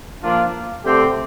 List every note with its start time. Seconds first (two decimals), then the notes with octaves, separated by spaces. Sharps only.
0.22 A#2 F3 A#3 D4 F4
0.84 D3 A3 C4 G4